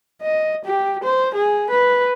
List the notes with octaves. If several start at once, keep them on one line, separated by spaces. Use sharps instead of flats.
D#5
G4
C5
G#4
B4